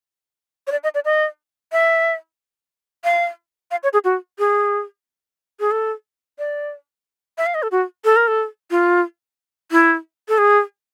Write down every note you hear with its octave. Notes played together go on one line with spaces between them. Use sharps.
C#5
D5
D#5
D5
D#5
E5
F5
F5
C#5
G#4
F#4
G#4
G#4
A4
D5
E5
F5
D#5
A4
F#4
A4
A#4
A4
F4
E4
A4
G#4